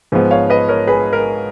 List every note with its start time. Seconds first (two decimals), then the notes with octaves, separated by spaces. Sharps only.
0.12 G#2 F3 G#3 B3
0.31 C#5 F5
0.50 B4 D#5
0.69 A#4 C#5
0.87 G#4 B4
1.13 A#4